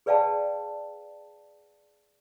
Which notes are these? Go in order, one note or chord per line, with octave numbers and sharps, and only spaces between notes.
G#4 B4 D5 F5 G5 A5